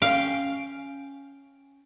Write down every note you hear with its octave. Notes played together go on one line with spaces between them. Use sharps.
C#4 F5 G5